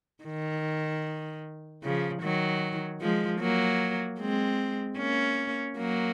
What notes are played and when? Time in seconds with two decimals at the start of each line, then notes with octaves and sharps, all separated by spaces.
0.24 D#3
1.83 C#3 F3
2.22 D#3 F#3
3.01 F3 G#3
3.41 F#3 A#3
4.19 G#3 C4
4.98 A#3 C#4
5.77 F#3 A#3